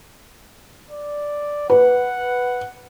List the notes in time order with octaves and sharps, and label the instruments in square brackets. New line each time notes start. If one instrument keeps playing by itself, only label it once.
[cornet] D5
[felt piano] B4 [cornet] F#5